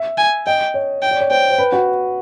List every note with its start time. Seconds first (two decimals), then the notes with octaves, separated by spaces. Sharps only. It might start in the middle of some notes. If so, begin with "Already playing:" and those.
Already playing: E5
0.18 G#5
0.46 D#5 G5
0.74 C#5
1.02 G5
1.11 D5
1.21 C#5
1.31 C5 G5
1.50 C5
1.58 B4
1.72 F#4